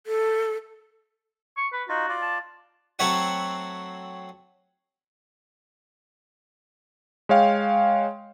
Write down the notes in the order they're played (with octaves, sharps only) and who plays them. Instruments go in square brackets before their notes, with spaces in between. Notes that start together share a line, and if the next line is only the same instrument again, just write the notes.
[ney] A4
[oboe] C#6
B4
[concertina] D#4 F4 [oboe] F#4
[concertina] F4 D5
[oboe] A5
[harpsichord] F#3 A3 C4 C#5 E5 F#5
[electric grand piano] G#3 C#5 F5 G5